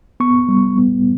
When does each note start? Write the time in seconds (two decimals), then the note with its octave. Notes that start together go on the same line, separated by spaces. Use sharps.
0.20 B3 C#6
0.49 G3
0.78 B3